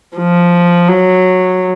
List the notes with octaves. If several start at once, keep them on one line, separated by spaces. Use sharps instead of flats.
F3
F#3